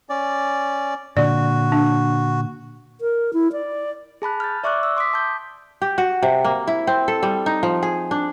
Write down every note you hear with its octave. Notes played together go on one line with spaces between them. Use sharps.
C#4 D5
A#2 D3 F#4 D5
D4
A#4
E4
D5
G#4 A5 B5 F#6
F6 G6 A6
D5 E5 C#6 D6 E6 F#6
E6
C6 D6 D#6 B6
A5 G6
G4
F#4
C3
A#3
E4
C4
A4
G3
D#4
F3
G#4
D4